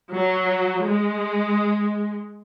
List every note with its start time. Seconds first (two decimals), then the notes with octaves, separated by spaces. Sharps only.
0.14 F#3
0.85 G#3